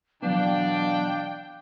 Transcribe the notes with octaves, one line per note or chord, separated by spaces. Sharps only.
B2 E3 F#3 B3 D4 F5 G5